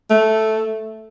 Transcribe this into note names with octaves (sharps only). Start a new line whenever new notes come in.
A3